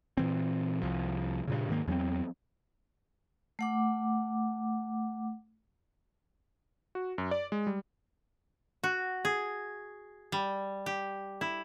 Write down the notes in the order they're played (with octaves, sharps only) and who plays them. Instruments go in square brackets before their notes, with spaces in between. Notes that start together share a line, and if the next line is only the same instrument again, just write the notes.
[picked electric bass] A#2 E3 C4
C2 F3
G2 A#2 C#3
G#2 D#3 A#3
E2 F#3 B3 C4
[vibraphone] A3 F#5 D6
[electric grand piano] F#4
F#2
D5
G#3
G3
[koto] F#4
G#4
G3
G4
E4